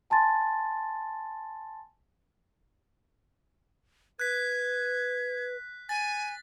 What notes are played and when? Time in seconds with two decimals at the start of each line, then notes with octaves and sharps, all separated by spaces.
0.10 G#5 A5 C6 A6
4.20 B4 F#6 G#6 B6
5.89 G#5 A6